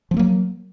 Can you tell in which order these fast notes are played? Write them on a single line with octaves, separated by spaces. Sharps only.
F3 B3 A#3 F#3